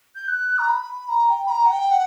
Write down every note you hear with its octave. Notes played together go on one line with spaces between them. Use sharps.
G6
F#6
A#5
B5
A#5
G5
B5
A#5
F#5
G5
F#5